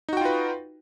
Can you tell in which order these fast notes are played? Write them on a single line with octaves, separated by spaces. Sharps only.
D#4 F#4 G5 F4 B4